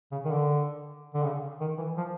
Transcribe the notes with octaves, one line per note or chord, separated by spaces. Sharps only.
C#3
D#3
D3
D3
C#3
D#3
E3
F3